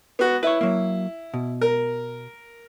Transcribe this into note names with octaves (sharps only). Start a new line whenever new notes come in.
B3 F#4
E4 B4 C#5
F#3 A#3
B2
A#4